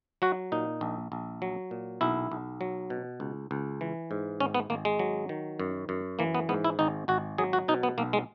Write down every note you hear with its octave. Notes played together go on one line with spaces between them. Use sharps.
F#3 F#4
A#2 D#4
A#1
A#1
F#3
A#2
B1 E4
B1
F#3
B2
C#2
C#2
E3
G#2
G#1 C#4
B3
G#1 A#3
G#3
F#3
D#3
F#2
F#2
E3 A#3
B3
G#2 B3
E4
G#1 D#4
G#1 F#4
F#3 G#4
F#4
B2 D#4
B3
B1 A#3
G#3